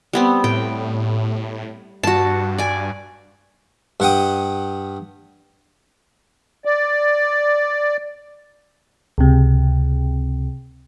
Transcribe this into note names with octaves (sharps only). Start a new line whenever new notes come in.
G3 B3 C4
A2 G5
G2 F#4 A5
D5 G#5
G2 F#5 G5 D#6
D5
C#2 C3